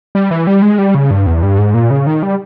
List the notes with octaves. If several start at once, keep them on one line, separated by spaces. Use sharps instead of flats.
G3
E3
G3
G#3
G3
C#3
G2
E2
G2
G#2
A#2
C#3
D#3
G3